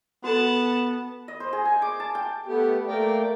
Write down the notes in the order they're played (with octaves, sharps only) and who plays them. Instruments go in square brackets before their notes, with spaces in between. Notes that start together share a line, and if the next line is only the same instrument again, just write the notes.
[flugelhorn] B3 [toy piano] F#4 A4 [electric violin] F#5 A5
[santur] D#5
C5
G#4
G#5
D6
A5
G5
[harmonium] A3 B3 G4
A3 A#3 A#4 D5 G5